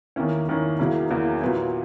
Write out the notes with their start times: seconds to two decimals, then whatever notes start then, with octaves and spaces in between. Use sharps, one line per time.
0.16 E2 D#3 A#3 C#4 E4
0.48 E2 D#3 A#3 C#4 E4
0.79 E2 C#3 F#3 A#3 E4
1.10 E2 C#3 F#3 A#3 E4
1.41 A#2 F#3 B3 E4